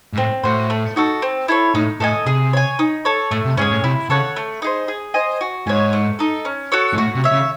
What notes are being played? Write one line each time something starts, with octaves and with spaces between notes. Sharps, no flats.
G#2
A2 C4
A2 F#4 C5
A3
D#4 F#4 A4
C4
E4 A4 C#5
A2 D#4
A2 A4 D#5 G#5
C3 G#4
C#5 G#5
D#4
A4 C#5
A2 A3
C3
G#2 C#4 G#4 C#5
A2
C3 E4
C#3 A4 C#5 F#5
A3
D#4 G#4 C5
G#4
C5 D#5 G#5
F#4
G#2 C#5 G#5
A3
D#4 A4
C#4
F#4 A4 C#5
G#2
A2 F#4
C3
C#5 E5
C#3